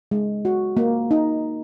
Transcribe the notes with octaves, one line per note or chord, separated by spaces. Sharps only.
G#3
F#4
A#3
D#4